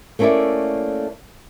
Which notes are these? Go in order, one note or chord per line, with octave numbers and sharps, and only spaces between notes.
A3 A#3 C#4 E4 A4 D5